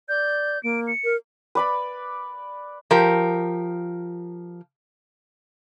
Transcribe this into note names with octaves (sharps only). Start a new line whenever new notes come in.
D5 G6
A#3 D7
C#7
A#4
B4 D5 B5
F3 G4 A#4